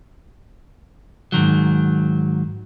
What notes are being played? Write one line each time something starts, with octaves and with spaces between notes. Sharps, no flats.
G#2 C3 D#3 F#3